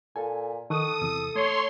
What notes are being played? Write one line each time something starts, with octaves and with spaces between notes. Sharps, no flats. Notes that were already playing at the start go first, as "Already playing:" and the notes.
A#2 A4 G#5
D#3 A4 C#6 D#6 F#6
E2 C3 E6
A3 C#5 C6